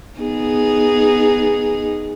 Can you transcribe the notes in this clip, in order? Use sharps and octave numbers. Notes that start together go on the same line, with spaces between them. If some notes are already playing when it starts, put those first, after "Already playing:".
B3 D#4 G#4